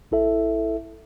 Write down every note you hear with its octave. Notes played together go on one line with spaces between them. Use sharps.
A1 E4 A4 E5